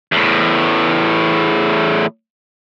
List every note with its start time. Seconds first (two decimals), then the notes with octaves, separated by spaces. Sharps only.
0.12 E2 A2